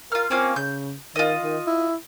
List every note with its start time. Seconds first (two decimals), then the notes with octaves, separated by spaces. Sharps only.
0.12 F4 A#4 F6
0.31 A#3 C4 C#4 F4
0.56 C#3 G6
1.16 D#3 F4 D#5
1.43 D#3
1.67 E4